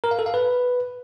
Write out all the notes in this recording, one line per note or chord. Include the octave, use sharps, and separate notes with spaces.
A#4
F5
A4
F5
B4